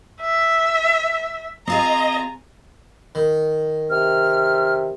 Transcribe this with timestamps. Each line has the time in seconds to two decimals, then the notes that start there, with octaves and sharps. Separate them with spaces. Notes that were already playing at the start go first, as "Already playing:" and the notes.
0.21 E5
1.67 C4 F4 G#4 D#5 G#5 A#5
3.15 D#3
3.90 C3 F6